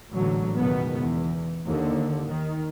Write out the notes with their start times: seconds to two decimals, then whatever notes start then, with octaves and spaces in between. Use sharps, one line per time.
0.14 A1 G#2 D3 F#3
0.57 C#2 F#2 B2 D#3 B3
1.00 E2
1.66 D#2 D3
2.27 D#3